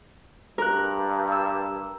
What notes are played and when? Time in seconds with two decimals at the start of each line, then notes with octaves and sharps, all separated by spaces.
0.58 G2 A#4 F#6
1.32 E6